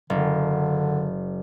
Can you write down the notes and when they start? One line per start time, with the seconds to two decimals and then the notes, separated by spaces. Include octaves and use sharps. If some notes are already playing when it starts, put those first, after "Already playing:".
0.10 F#1 D3